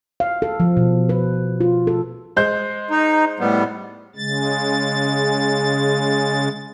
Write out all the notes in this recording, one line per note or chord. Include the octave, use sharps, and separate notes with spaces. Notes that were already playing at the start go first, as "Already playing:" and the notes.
F5
A4
F3
B2
B4
F4
A4
G#3 C5 G6
D#4
A2 G3 B3
C#3 G#3 A6